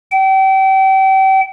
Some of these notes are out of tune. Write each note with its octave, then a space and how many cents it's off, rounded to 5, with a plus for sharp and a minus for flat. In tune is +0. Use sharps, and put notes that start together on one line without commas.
G5 -35